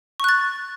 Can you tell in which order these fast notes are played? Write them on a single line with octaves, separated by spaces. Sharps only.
C#6 F#6 A6